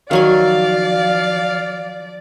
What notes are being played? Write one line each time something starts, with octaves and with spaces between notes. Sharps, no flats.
D#3 F3 F#3 D5 F5 G#5